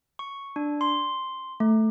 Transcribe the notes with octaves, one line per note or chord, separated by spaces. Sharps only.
C#6
D4
C6
A3